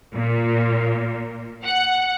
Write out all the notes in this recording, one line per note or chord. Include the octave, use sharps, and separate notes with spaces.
A#2
F#5